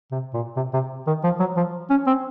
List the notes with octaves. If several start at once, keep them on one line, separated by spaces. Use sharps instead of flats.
C3
A#2
C3
C3
D#3
F3
F#3
F3
C#4
C4